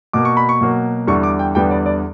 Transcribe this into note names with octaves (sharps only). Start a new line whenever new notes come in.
B2 A#3 D6
C#6
B5
C#6
B2 F#3 A#3
E2 D3 G3 C#6
D6
G5
E2 D3 G3 B3 G5
D5
D5